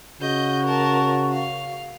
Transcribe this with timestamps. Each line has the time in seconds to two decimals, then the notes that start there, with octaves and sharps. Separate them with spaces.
0.21 C#3 F#4 D#5 G6
0.66 A#4 A5
1.32 F5